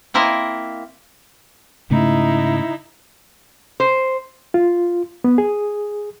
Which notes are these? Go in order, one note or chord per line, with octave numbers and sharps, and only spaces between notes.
A#3 C4 E4 A#4 D#5
G#2 C#3 A3 D#4 E4
C5
F4
B3
G#4